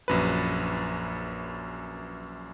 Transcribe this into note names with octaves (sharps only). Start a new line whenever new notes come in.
A#1 F#2 B4